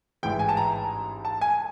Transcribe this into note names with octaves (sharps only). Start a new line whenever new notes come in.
A1 G#2 E3 G#3 G5
G#5
A5
A#5
A5
G#5